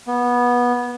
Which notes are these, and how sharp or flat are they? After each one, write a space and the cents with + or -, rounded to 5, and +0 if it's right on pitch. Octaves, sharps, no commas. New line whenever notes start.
B3 -20